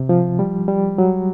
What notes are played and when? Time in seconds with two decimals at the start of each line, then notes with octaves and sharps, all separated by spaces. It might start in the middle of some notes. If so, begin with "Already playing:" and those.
Already playing: C3
0.09 F3
0.39 G3
0.68 G3
0.98 F#3